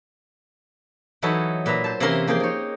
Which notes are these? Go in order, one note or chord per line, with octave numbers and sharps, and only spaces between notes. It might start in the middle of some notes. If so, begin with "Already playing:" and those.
E3 F#3 D#4 A4 C#5 B5
A#2 B4 E5 A#5
C5 A5
C3 E3 A#3 C#4 A#4 C6
F3 A#3 G#4 G5 C6
D#4 C#5